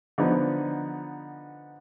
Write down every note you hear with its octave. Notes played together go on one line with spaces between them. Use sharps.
D3 F3 B3 D#4